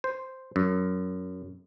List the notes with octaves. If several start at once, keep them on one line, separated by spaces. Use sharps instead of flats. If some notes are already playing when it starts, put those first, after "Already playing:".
C5
F#2